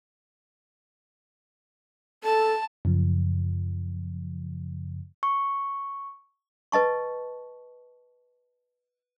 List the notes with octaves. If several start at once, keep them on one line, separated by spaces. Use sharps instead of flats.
A4 A5
F#2 C#3 F3
C#6
B4 D#5 A5 C#6